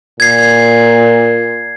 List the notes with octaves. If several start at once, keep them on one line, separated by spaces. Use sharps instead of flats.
A#2 G#6 C7